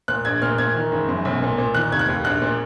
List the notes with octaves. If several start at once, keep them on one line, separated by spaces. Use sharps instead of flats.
A#2 F#6
A#1 G#6
A#2 F6
A#2 G#6
D#3
F#1
F#2
B1
A#2
A#2
D#3 F#6
F1 G#6
F#6
D#2
A#1 F#6
A#2